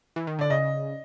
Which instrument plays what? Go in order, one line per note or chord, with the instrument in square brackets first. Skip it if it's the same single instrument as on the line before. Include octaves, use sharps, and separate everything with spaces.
[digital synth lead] E3
D#3
[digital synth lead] D3 [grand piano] D5
[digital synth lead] C#3 [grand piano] D#5